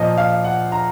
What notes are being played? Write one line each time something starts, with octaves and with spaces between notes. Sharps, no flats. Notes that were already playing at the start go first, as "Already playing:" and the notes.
Already playing: A#2 F3 D#5
F5
F#5
A#5